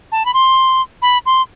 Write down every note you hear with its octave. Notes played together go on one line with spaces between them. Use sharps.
A5
B5
C6
B5
C6